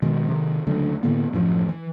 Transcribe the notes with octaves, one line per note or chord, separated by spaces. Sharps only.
B2 D#3 G#3
C3 D#3
C#2 D3 F#3 A3
A2 D3 A#3 B3
A1 F#2 A2 F3
E3